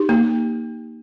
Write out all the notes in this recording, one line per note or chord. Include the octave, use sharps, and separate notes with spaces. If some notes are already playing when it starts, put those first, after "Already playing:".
Already playing: D#4 G4
A#3